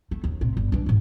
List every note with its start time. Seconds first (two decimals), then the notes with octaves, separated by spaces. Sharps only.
0.11 A3
0.24 D#2
0.41 A2 C3
0.57 G1
0.72 E3 D4
0.86 A1 G#2